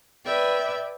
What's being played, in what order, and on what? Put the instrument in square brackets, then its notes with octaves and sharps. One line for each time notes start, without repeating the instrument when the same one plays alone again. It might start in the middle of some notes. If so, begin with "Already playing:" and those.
[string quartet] B4 D5 E5 G5 G#6